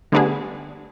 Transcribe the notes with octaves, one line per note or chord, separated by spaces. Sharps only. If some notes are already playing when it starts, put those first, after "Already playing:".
D3 G3 A3 B3 D4 G#4